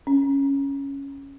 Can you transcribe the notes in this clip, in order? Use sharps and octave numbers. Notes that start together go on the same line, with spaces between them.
C#4